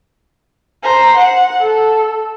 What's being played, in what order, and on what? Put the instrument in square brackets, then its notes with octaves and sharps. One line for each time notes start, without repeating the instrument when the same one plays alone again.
[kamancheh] C5 A#5
F#5
A4